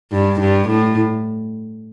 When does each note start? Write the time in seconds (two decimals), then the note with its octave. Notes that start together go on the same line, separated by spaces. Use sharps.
0.12 G2
0.40 G2
0.69 A2